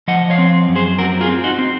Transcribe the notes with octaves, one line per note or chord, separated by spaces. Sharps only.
F3 D#5 F#5
C#5 F5
C4
F#2
G#4 C5
C4 F#4 A#4
F4 G#4
C4
D#4 F#4
C4